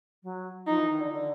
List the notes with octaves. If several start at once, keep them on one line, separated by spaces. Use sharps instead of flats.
F#3
F3 D#4
E3
D#3
D3
D3